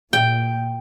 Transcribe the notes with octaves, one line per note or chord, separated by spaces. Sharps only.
A#2 G5